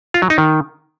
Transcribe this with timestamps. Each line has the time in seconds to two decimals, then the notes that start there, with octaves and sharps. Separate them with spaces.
0.14 F4
0.22 F#3
0.30 D#4
0.38 D#3